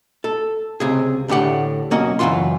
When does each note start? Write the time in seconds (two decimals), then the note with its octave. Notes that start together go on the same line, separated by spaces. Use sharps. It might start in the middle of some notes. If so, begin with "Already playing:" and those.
0.24 A4
0.80 C#2 C3 G#4
1.28 D2 A2 D4 G4 F#5
1.91 B1 A#3 C#4 F#4 D#5
2.19 C#2 F#2 E3 F4 F#4 C6